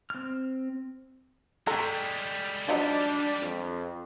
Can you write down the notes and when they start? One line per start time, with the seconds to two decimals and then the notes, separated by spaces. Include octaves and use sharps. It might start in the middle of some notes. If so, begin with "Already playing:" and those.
0.10 C4 F6
1.67 G3 G#3 A4 G5 A#5
2.69 F3 F#3 D4 D#4
3.42 F2